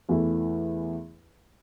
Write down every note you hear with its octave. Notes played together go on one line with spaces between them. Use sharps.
E2 E3 A3 E4